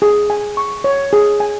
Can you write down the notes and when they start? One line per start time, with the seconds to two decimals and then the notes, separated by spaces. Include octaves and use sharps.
0.02 G#4
0.30 G#5
0.57 C#6
0.84 C#5
1.13 G#4
1.40 G#5